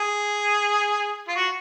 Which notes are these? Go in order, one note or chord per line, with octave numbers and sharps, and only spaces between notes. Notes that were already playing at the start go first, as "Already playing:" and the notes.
Already playing: G#4
F4
F#4